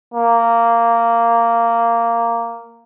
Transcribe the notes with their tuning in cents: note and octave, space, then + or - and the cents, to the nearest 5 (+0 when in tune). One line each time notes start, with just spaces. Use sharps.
A#3 -10